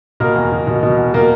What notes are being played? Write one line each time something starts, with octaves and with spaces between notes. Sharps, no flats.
B2 A#3 A#4
E2
B2
B2
B2
E2
B2 A#3 A#4